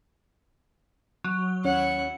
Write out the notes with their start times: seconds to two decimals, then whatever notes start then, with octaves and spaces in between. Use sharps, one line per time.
1.24 F#3
1.64 D#2 C#4 E4 C#5 F#5